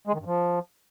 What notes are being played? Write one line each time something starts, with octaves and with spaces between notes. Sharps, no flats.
G#3
D#3
G2
F3